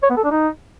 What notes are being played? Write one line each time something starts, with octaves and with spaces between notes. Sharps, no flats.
C#5
B3
A4
D4
D#4